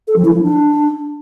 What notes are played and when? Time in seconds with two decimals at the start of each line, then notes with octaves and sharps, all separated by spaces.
0.08 A4
0.16 F3
0.25 E4
0.34 F3
0.42 D4